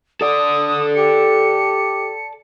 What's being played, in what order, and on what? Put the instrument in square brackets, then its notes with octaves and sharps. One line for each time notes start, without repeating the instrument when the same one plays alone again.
[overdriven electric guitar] A4 D5 [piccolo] D#6
[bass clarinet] G4 [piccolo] C#7